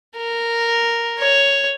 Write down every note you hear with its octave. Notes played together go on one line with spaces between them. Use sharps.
A#4
C#5